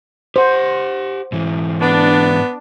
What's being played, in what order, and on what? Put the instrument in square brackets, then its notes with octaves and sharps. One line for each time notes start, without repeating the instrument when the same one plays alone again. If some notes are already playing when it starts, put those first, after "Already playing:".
[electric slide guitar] G4 F#5 [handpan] C5
[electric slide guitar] G#2 E3
[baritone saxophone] B3 [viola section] D4